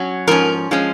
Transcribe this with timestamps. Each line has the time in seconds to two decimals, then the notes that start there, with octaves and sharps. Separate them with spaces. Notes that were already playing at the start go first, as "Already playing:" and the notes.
Already playing: F#3 C#4
0.27 G#2 F3 C#4 A#4
0.71 F3 G#3 C#4